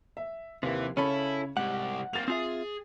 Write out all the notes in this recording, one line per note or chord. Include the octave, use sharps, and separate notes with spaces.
E5
D#2 C3 E3
C#3 C#4 E4 A4 C#5 B5
C2 G#2 G4 F#5
A#3 C4 A6 F7
C4 F4 G#4 E5